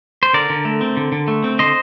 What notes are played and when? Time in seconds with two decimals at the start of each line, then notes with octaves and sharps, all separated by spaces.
0.23 C5
0.34 D3 A#4 D5
0.50 D3
0.65 A3
0.81 C4
0.97 D3
1.12 D3
1.28 A3
1.44 C4
1.59 D3 C5 D#5